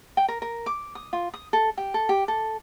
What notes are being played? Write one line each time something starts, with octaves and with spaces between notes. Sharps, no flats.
G5
A#4
A#4
D6
D#6
F4
D#6
A4
G4
A4
G4
A4